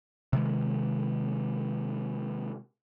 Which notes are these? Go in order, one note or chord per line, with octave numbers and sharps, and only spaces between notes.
C3 D#3 G#3